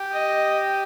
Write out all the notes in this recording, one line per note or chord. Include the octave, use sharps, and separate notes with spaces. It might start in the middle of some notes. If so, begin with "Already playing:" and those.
Already playing: G4
D#5